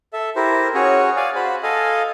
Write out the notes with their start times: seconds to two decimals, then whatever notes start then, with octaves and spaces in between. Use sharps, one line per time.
0.13 A4 E5
0.36 E4 G4 A#4 C5
0.74 C#4 F#4 G#4 C#5
1.17 D5 F5 G#5
1.36 F#4 C5 B5
1.63 A4 D#5 F5 G#5